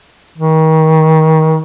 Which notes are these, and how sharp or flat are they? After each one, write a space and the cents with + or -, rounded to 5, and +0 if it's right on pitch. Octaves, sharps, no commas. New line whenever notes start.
D#3 +30